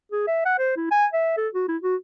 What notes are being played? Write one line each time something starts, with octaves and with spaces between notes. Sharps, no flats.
G#4
E5
F#5
C5
E4
G#5
E5
A4
F#4
E4
F#4